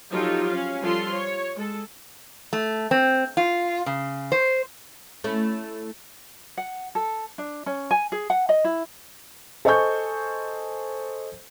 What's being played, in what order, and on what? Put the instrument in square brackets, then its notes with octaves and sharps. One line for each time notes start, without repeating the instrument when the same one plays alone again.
[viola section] F3 F#3 D#4 F4 G4 A4
C#4 F5
F3 G3 F4 A4 C6
C#5
G#3 A4
[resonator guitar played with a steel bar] A3
C4
F4
C#3
C5
[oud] A3 C#4 E4
[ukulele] F#5
A4
D4
C#4
G#5
G#4
F#5
D#5
E4
[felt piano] A4 C5 D#5 G#5 C#6 G6